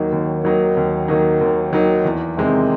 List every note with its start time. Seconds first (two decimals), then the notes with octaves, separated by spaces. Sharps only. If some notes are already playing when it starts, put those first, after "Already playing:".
Already playing: D#2 D#3 F#3 A#3 D#4
0.12 D#2
0.44 D#3 F#3 A#3 D#4
0.77 D#2
1.08 D#3 F#3 A#3 D#4
1.41 D#2
1.72 D#3 F#3 A#3 D#4
2.05 E2
2.37 C3 D#3 G#3 C4